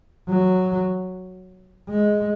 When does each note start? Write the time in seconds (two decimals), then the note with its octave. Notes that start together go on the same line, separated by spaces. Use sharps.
0.29 F#3
1.89 G#3